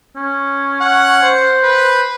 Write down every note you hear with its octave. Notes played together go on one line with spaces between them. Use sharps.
C#4
F#5
C5
B4